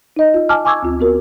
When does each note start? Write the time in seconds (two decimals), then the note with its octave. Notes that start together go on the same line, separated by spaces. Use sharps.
0.16 D#4 D#5
0.34 F4
0.49 G#5 A5 D6 F6
0.65 G#5 C#6 D6 E6 G#6
0.83 D2 C4 F4
1.00 B3 F#4 A#4